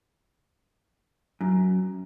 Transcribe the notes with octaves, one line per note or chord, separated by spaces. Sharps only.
F#2